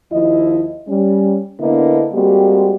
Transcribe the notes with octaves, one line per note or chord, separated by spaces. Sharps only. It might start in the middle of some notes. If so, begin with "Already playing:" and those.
D#2 F3 E4 D#5
G3 C#4
D3 A#3 B3 D4 E4 D#5
G3 G#3 A#3 C4 F#4 G4